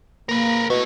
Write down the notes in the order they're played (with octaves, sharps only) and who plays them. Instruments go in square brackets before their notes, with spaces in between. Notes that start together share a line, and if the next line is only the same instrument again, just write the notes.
[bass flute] A#3 [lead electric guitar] A#4 B4
[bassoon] B2 [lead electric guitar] A3 E4